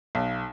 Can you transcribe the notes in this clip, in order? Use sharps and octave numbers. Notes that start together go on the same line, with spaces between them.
B1